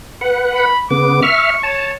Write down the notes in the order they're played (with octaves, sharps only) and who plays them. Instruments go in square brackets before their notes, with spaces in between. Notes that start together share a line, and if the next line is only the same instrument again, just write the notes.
[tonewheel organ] B4 F#5
[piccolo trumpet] B5
[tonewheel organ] C#3 B3 [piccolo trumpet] D6
[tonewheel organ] E5 F6 [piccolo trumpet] C#6
[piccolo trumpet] C#5 [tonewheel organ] A5